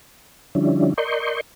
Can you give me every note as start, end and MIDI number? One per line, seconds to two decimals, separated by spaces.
0.55 0.94 50
0.55 0.94 53
0.55 0.94 55
0.55 0.94 61
0.55 0.94 62
0.55 0.94 64
0.98 1.41 70
0.98 1.41 74
0.98 1.41 75
0.98 1.41 84
0.98 1.41 85
0.98 1.41 91